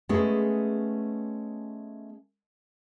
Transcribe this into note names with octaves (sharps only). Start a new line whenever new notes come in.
G#3 A3 B3 C#4 G#4